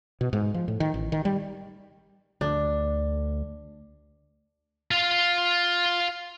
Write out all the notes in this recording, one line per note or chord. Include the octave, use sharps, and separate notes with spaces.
B2
G#2
F3
A2
D#3
A1
D#3
G3
D2 D4
F4 F5